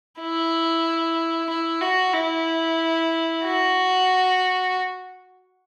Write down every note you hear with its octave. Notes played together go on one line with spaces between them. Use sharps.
E4
E4
F#4
E4
F#4